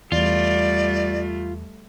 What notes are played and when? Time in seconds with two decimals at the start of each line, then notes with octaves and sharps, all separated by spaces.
0.12 E2 G3 A3 F4 D5